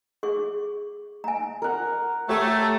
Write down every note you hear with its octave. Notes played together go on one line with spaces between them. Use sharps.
G#4 C#6
G#5 A#5
A#4 F#5
A3 G4 C#5